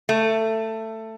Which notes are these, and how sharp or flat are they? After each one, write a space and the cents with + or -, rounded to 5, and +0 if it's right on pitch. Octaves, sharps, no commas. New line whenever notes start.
A3 +15